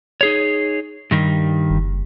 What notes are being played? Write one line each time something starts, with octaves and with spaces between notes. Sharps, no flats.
D#4 G#4 C#5
G2 D#3 G3
F#1